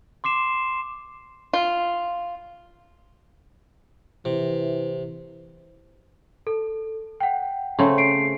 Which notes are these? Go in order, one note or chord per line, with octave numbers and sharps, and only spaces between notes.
C6 D6 C7 E7
F4
C3 E3
A4
F#5 G5
C#3 A3 C4
C7 D7